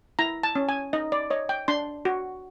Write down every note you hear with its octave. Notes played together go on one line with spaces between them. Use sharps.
E4 A#5
A5
C#4
G#5
D#4 D#5
D5
C#5 D#5
G5
D4 C6
F#4